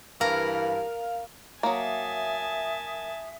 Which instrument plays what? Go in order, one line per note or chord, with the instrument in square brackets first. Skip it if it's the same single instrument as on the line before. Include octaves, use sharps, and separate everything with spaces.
[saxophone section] G2 E3 [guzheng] A#4 [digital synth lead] F5
[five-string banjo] F#3 A#3 [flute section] E5 D#6 [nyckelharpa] G#5 A5